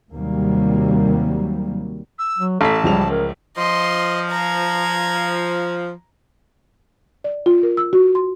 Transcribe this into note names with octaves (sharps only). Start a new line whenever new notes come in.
D#2 C3 F#3 G3 A#3
E6
F#3
A1 A4 A5 B6 C7
C#2 F3 G3 F7
A#4
F3 D#5 C6
A#5 G#6
D5
F4
A#4
E6
F#4
C6